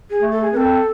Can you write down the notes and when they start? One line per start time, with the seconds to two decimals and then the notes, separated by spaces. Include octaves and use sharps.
0.10 G#4
0.21 A3
0.32 A4
0.41 G#4
0.52 C4 B4
0.57 A4